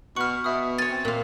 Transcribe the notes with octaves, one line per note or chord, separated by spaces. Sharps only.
B2 F#5 C#6 F6
B2 E5 D#6
C#5 G#5 A6
C4
A#2 F5